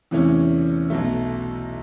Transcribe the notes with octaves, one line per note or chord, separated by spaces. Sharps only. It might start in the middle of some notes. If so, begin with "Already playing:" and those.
E2 C3 E3 A3 C#4
B1 B2 F#3 A3